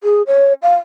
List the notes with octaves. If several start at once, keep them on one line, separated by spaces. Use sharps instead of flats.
G#4
C#5
F5